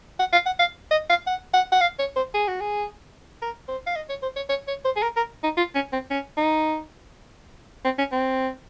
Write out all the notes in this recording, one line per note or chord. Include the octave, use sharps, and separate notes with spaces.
F#5
F5
F#5
F5
D#5
F5
F#5
F#5
F#5
F5
C#5
C5
G#4
F#4
G#4
A#4
C5
F5
D#5
C#5
C5
C#5
C#5
C#5
C5
G#4
A#4
A#4
D#4
F4
C#4
C4
C#4
D#4
C4
C#4
C4